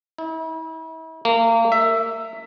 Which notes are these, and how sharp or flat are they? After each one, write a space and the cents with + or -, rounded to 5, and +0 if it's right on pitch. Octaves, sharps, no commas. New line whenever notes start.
E4 -40
A#3 -30
E5 +10